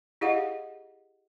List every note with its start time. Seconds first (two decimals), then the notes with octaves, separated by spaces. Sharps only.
0.21 E4 G4 G#4 D#5 F5 F#5